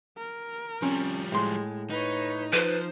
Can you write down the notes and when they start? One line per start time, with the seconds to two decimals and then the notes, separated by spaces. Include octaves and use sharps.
0.17 A#4
0.82 F3 G3 C4 C#4
1.32 A2 G#3 C6
1.90 D#4 B4 C#5
2.53 F3 D#4 B4 C5